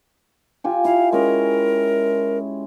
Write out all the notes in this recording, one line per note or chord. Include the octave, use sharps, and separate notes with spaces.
F4 G4 G#5
E4 F5
G#3 C#4 A#4